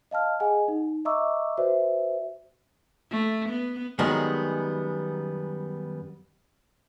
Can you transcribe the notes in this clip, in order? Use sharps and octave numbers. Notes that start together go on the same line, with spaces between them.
D#5 F5 A5 F6
G#4 D#5 F#5 G#5
D#4
D#5 E5 A#5 C#6 D6 E6
F#4 B4 C5 D5 E5
A3
B3
F#2 D#3 G3 G#3 B3